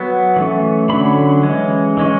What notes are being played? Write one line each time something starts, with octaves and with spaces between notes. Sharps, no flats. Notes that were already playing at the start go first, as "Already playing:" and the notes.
Already playing: F#3 B3
E3 A3 C#4
D3 F#3 C#4 B5
E3 G#3 C#4
E3 G#3 C#4